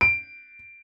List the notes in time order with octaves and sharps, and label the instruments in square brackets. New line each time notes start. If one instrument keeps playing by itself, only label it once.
[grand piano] D7